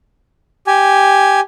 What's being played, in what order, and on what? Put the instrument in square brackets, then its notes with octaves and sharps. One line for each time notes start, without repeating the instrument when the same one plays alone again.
[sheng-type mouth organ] G4 G#5